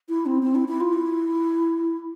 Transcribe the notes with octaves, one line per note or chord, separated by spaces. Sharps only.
E4
C4
C4
E4
E4
F4
E4